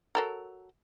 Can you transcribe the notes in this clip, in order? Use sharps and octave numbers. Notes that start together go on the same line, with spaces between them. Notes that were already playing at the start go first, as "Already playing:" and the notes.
F#3 A4 A#4